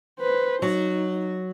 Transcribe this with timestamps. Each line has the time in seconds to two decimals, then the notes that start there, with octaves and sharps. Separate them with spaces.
0.19 B4 C5
0.62 F#3 D#4